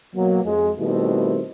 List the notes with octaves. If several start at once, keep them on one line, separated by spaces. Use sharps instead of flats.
B2 F#3 A#3
F2 G#3
B2 D#3 G3 A3 C4 E4